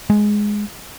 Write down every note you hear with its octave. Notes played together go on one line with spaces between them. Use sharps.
G#3